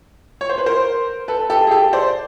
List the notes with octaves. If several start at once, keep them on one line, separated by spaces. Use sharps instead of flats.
C#5
C5
B4
A#4 C5
A4 B4
G4 A4
G#4
G4 A4
C5 D5